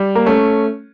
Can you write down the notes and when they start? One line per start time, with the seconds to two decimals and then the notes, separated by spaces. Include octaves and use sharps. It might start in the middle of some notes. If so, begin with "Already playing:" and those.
Already playing: G3
0.15 A#3
0.26 A3 C#4